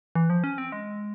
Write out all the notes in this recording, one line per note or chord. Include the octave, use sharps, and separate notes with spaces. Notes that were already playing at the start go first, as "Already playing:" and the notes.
E3
F3
C#4
C4
G#3